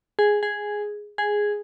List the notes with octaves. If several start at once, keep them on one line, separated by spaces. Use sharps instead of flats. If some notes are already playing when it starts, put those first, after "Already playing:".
G#4
G#4
G#4